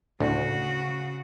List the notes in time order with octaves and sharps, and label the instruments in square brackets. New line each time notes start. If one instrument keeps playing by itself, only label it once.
[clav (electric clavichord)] D2 [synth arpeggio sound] A2 [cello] C#3 F#4